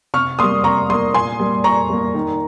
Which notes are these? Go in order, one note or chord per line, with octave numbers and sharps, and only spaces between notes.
C3 C#6 F6
G3 A#3 C6 D#6
C3 A#5 C#6
G3 A#3 C6 D#6
A#2 G#5 C6
G3 A#3
A#2 A#5 C#6
G3 A#3
D#3